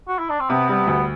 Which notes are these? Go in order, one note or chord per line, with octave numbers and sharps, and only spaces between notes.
F#4
E4
D4
C4
C3 B3
G3 B3
D2 B3